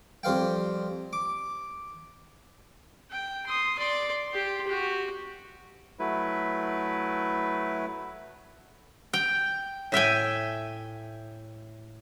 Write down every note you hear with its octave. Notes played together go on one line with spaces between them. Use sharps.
F2 G3 C5 F5 G5
D6
G5
C6 D#6
D5 C6
G4 C6
F#4 G4
F#3 A3 E4 B4
G5
A2 E5 G5 G#5